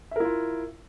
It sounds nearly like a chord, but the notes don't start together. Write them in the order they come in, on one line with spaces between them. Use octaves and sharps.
E5 A#4 E4 F4